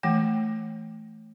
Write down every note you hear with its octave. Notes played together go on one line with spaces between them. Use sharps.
E3 A3 G5